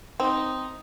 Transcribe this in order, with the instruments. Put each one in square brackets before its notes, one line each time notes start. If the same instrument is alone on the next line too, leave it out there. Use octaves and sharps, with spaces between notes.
[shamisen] C4 [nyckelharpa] D#4